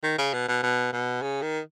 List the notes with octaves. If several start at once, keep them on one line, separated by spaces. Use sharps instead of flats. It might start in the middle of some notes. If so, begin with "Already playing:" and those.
D#3
C#3
B2
B2
B2
B2
C#3
D#3